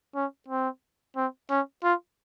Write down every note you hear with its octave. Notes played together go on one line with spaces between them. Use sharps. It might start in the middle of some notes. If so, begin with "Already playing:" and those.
C#4
C4
C4
C#4
F4